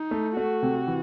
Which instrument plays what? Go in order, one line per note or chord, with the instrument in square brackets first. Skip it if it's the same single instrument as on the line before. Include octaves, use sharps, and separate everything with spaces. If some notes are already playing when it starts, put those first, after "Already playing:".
Already playing: [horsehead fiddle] D#4
[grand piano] A3
[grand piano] A3 [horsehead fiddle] F#4
[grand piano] C3
E3